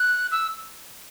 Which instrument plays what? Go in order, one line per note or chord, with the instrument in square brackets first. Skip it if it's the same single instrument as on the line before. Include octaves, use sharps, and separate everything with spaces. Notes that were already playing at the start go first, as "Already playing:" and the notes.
Already playing: [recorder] F#6
E6